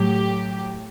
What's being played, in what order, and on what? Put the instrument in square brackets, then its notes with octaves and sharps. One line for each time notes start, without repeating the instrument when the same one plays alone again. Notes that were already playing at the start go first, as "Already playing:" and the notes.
Already playing: [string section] A2 F#3 G4